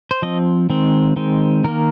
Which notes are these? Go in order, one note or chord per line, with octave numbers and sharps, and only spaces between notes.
C5
F3 C4 D#5
D#3 G#3 C4
D#3 G#3 C4
D#3 A#3 A#4